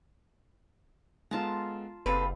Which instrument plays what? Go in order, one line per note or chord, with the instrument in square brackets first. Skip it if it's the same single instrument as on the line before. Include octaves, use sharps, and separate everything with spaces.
[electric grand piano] G#3 B3 A4 [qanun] F4 A5 A#5
[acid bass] F#1 [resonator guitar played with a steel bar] C4 A4 B4 [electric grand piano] G4 F5